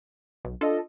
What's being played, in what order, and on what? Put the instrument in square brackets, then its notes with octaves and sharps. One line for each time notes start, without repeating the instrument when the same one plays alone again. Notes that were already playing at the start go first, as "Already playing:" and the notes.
[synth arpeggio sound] B1
[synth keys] D4 D#5 [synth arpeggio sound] F4 A4